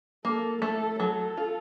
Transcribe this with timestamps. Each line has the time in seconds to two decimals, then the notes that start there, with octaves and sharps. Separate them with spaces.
0.25 A#3 A4
0.62 A3 A4
1.00 F#3 A4
1.37 F4